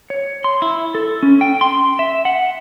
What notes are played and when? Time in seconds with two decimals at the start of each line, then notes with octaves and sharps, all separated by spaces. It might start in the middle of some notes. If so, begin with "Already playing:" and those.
0.10 C#5
0.44 C6
0.62 E4
0.95 A4
1.23 C#4
1.41 G5
1.61 C6
1.99 E5
2.25 F#5